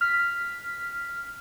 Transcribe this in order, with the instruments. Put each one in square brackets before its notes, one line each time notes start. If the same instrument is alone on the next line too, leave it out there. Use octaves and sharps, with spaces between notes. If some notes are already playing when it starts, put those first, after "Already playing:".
[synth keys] F6 B6